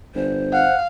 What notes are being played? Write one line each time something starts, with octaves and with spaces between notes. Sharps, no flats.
G1 C5
F5 F#5